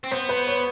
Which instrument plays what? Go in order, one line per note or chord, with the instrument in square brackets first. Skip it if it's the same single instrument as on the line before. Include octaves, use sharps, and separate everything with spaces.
[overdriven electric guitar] C4
[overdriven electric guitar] B3 [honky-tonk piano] C5
[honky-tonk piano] B4
C#5